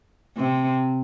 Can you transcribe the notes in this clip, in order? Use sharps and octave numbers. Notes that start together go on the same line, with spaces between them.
C3